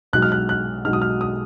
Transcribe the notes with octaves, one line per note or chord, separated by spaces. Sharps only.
B1 B2 G#3 D#4 F#6
F6
F#6
F#6
B1 B2 G#3 D#4 F6
D#6
F6
D#6